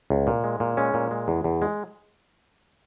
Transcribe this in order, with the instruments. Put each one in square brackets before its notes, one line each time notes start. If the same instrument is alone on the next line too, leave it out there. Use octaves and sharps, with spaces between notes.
[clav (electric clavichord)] C#2
A#2
G#3
A#2
G#3 C#4
A#2
G#3
E2
E2
G#3